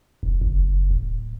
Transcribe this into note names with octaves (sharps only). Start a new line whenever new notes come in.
E1
F#1
D1